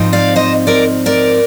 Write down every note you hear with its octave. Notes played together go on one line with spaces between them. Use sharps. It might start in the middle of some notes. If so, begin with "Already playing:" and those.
Already playing: G#2 F3 C4 D#4
D5 F5
C5 D#5
A#4 D5
A#4 D5